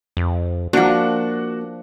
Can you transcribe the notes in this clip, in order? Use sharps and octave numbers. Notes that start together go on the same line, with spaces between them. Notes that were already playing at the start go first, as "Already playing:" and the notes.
F2
F3 A#3 D4 F#4 F#5